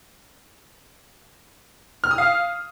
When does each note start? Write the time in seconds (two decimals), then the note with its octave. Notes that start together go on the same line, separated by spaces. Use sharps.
2.04 F6
2.11 D#6
2.18 F5